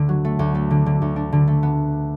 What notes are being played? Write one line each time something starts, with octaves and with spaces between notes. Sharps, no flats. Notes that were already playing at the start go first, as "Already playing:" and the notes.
Already playing: D2 D3 D4
F#3
A3
D2
A3
D3
D3
D2
D4
D3
A3
B3